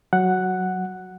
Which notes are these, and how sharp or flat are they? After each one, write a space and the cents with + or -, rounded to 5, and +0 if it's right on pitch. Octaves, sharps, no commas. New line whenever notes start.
F#3 +0 F#5 +0